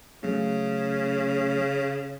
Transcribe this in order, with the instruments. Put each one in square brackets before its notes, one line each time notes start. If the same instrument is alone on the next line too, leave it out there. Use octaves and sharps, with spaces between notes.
[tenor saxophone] C#3 [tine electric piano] F#3 A3 C#4